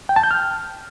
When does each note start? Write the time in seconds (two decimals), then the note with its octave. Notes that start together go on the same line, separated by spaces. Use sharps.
0.09 G5
0.16 A5
0.23 G6
0.31 F6